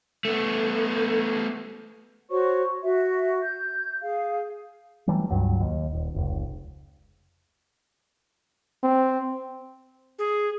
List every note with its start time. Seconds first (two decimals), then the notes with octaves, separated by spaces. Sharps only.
0.25 A3 B3
2.30 F#4 C5 C#5 C#6
2.82 F#4 E5
3.42 G6
4.01 G#4 F5
5.07 E3 F#3 G3 A3
5.30 C#2 G2 F#3
5.61 D#2
5.93 D#1
6.15 F1 C#2
8.83 C4
10.19 G#4